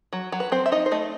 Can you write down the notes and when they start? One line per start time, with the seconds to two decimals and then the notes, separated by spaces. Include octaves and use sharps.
0.13 F#3
0.32 F#3
0.40 B4
0.52 C4 C5
0.66 E5
0.72 D#4 D#5
0.86 C5
0.92 A3 D#5